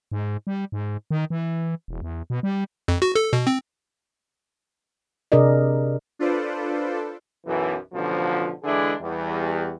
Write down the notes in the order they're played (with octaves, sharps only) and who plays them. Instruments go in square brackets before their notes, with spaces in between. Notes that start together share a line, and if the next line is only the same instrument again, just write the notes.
[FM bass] G#2
G3
G#2
D#3
E3
E1
E2
B2
G3
[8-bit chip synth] F2
F#4
A4
B2
C4
[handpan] C3 D4 G#4 A#4 D5 D#5
[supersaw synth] D4 F4 A4 B4 C5 D5
[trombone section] B1 F#2 E3
A1 B2 D3 F3
D3 E3 G#3 D4 E4 G#4
E2 G3